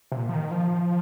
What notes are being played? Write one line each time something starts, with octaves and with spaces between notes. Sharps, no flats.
C3
A#2
F3
D#3
F3